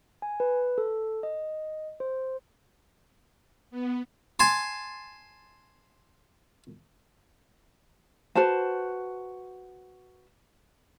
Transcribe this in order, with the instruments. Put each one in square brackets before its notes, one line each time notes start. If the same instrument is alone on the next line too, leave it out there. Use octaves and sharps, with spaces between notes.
[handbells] G#5
B4
A4
D#5
C5
[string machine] B3
[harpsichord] G#5 A5 C6
[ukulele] F#4 B4 C5 A5